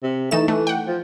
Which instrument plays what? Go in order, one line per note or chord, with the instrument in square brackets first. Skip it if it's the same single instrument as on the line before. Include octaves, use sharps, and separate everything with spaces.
[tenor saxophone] C3
[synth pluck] E3 D#4 E7 [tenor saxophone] A3
[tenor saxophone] E3 [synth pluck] A3
[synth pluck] F#5 G5
[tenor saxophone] F3